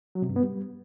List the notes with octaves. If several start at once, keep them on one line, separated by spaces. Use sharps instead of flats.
F#3
C3
G2
B3
G3